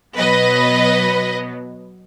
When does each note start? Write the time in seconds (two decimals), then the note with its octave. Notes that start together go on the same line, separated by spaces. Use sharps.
0.17 B2 F#3 B3 B4 D#5